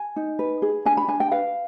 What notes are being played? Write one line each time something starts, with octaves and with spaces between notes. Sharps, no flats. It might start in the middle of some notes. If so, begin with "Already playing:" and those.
Already playing: G#5
D#4
B4
G#4
D4 G#5
B5
D4 G#5
G5
B4 F5